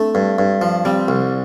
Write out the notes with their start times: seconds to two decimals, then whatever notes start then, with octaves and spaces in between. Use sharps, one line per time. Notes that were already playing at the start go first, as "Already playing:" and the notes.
Already playing: A3 C4 D4
0.15 G2
0.39 G2
0.62 F3
0.85 G3 C4
1.08 C2